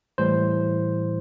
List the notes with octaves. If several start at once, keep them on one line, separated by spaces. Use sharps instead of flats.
A2 E3 G3 C5